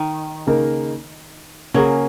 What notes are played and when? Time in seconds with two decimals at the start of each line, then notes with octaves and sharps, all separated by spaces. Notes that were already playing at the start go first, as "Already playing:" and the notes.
Already playing: D#3
0.47 C#3 A#3 D#4 A#4
1.74 C#3 F#3 A#3 C#4 G#4